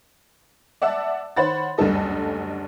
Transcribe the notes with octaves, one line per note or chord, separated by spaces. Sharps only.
D5 E5 F#5 A5 E6
D#3 C5 C#5 F#5 B5 A6
F#1 D2 G2 G3 A4 D#5